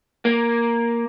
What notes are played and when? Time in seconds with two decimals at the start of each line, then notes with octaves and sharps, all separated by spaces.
0.25 A#3